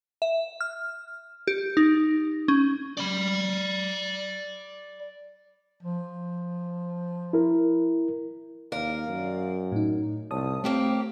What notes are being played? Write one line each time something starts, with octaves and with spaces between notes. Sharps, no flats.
E5
F6
G4
D#4
C#4
D5 B5
F3
E4 A#4
D#2 A#4 D5 F5
F#2
A2 D#4
C2 C#5 A5 D#6
A3 A#3 C4 G4 C#5